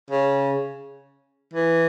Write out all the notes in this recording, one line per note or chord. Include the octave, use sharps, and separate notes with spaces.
C#3
E3